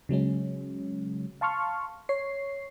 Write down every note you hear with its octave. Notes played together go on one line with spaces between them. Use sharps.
C#3 F#3 G#3 C#4
F5 A5 C6 C#6 F6
C#5 C7